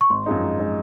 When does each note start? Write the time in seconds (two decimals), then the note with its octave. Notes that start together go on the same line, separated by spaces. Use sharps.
0.01 C#6
0.10 G#1 C6
0.26 F#2 F3 G#3 D#4
0.43 G#1
0.59 F3 G#3 D#4